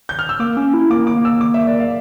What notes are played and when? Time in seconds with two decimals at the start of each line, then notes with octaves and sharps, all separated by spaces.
0.09 G6
0.19 F6
0.29 E6
0.39 A#3 D6
0.57 C#4
0.74 E4
0.90 A#3 D6
1.07 D6
1.16 A#3
1.25 E6
1.41 D6
1.54 E5
1.67 D5
1.80 F5